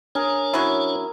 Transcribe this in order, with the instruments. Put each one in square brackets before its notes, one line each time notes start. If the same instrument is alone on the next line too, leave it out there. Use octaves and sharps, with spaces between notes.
[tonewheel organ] D4 C#5 [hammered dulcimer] G#4 A#4 A#5
[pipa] F#3 C#4 E4